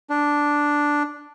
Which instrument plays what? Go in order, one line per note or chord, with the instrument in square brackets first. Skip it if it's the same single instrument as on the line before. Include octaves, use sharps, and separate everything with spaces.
[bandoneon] D4